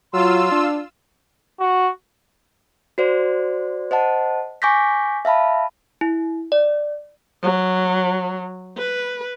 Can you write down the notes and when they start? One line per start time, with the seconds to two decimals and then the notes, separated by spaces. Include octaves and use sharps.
0.13 F#3 F4 C6 E6
0.51 D4
1.60 F#4
2.98 F#4 C5 D5
3.91 C5 D#5 F#5 A5
4.62 G#5 C#6 D6 G6 A#6 B6
5.25 E5 F5 A5 B5
6.01 E4
6.52 D5
7.43 F#3
8.78 B4